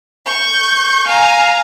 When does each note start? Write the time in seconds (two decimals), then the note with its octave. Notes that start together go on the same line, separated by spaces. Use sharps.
0.25 C#6 G6
1.05 F5 G#5 A#5